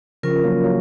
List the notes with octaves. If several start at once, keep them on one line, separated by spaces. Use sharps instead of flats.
C#3 F3 C#4 F4 A#4
F#3 A#3
F#3 A#3